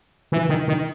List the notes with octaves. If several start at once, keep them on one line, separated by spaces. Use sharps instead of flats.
E3
D#3
D#3